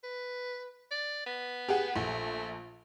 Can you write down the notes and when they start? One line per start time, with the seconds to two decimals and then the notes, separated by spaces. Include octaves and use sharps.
0.04 B4
0.91 D5
1.26 B3
1.69 G4 G#4 F#5
1.95 A#1 A3